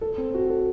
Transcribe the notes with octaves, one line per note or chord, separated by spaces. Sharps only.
A4
C4
F#4
A4